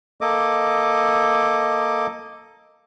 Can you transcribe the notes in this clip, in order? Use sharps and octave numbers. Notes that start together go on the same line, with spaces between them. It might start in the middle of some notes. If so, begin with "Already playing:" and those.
A#3 A4 D#5 D6